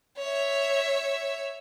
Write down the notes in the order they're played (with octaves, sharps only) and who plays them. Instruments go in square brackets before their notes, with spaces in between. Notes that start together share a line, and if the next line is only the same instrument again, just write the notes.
[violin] C#5 E5